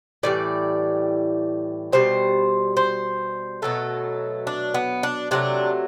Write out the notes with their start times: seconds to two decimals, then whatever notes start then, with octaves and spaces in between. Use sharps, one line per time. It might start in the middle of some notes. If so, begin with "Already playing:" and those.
0.23 A2 E3 G3 D5
1.93 B2 G3 C5
2.77 C5
3.62 B2 F#3 A3 A4
4.47 D4
4.74 B3
5.03 D4
5.31 C3 F#3 A3 D4